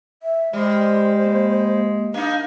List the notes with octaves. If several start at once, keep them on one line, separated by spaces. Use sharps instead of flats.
E5
G3 G#3 C5
A#3
A#3 D4 D#4 F5